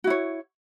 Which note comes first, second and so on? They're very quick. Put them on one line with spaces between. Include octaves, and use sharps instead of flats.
F#4 E4 C#5